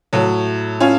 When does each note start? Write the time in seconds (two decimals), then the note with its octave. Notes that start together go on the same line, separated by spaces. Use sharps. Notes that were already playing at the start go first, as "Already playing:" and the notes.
0.13 A2 F#3
0.80 C#4 F4